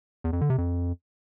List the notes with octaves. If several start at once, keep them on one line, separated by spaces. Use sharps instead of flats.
E2
F2
D3
C3
F2